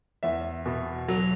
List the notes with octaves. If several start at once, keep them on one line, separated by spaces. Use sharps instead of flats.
E2 E5
B2
F#3